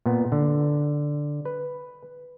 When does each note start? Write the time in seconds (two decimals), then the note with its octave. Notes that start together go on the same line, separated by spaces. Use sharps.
0.06 A#2 B3
0.32 D3
1.45 B4